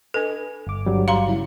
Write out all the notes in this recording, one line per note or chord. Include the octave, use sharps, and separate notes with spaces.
D4 A4 B4 D#5 G#5
G1 D6
G2 F#3 G3
F5 A#5 C6
C#3 C#4 E4